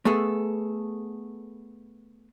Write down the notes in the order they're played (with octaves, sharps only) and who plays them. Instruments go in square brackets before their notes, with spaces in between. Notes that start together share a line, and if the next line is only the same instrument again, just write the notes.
[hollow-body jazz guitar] A3 B3 G#4 A4